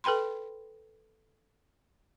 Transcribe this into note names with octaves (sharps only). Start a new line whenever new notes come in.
A4 B4 G5 B5 C6